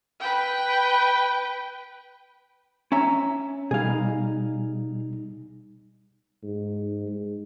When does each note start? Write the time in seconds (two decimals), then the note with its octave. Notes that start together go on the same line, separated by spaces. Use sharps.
0.20 B4 G5
2.92 C#4 E5 A#5
3.71 B2 G3 D#4 G#4 F5
6.43 G#2
7.08 G#3